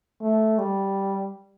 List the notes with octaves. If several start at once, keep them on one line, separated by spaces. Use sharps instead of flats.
A3
G3